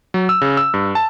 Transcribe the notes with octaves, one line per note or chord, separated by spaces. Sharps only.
F#3
E6
C#3
E6
G2
A5